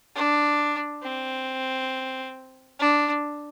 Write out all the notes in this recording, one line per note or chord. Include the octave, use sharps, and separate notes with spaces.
D4
C4
D4